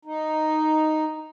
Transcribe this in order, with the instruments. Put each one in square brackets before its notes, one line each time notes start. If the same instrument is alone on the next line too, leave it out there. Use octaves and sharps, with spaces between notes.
[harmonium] D#4